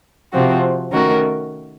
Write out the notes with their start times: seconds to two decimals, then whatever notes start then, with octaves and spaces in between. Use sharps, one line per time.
0.32 C3 F3 C4 F#4
0.92 D#3 A3 C#4 F#4 A#4